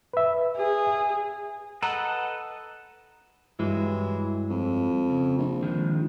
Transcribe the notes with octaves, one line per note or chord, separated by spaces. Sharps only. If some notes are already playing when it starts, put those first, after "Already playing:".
B4 E5
G#4
A4 B4 D#5 F#5 A#5
G2 E3 F#3 G#3
F2
C#3
A#1
D#3 F3 G#3